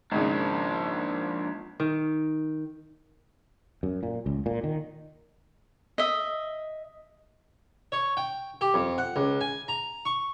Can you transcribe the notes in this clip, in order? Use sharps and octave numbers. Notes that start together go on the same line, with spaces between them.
G#1 C#3 F3 A#3 D4
D#3
F#2
A#2
C#2
A#2
D#3
D#5 E5
C#5
G5
G4
F2
F#5
C#2
G#5
A#5
C#6